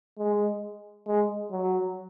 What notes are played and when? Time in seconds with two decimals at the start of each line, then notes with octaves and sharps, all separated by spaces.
0.18 G#3
1.07 G#3
1.51 F#3